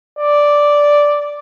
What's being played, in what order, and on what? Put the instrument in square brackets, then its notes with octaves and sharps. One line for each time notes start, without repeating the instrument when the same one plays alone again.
[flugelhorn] D5